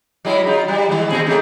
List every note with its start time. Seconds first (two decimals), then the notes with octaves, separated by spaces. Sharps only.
0.25 F#3 G#3 E4
0.45 F#3 D#4 F4
0.68 G3
0.89 D#3 G#3
1.09 A#2 C4 G#4
1.26 C#3 A3 D#4